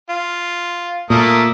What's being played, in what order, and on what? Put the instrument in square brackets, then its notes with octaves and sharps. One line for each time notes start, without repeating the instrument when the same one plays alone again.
[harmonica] F4
[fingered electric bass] A#2 [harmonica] A3 A#3 D#6